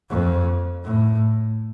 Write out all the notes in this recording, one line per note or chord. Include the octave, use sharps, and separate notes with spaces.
F2
A2